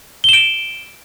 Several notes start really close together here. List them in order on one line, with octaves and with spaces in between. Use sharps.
G7 E7 D7